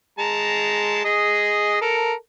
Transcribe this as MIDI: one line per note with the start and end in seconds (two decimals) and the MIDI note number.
0.19 1.03 56
0.19 1.03 81
0.19 1.03 82
1.05 1.81 68
1.05 1.81 75
1.81 2.13 69
1.81 2.13 70